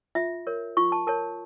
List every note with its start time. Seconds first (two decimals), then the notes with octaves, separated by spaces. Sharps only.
0.15 F4 E5
0.47 A#4 C#5
0.77 F4 C#6
0.92 A5
1.07 A#4 C#5 A5